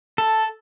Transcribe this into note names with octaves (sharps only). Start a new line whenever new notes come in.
A4